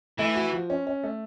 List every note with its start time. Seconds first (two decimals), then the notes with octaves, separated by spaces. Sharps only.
0.19 E3 A3
0.35 F#4
0.53 F3
0.70 C#4
0.87 C#4
1.03 A3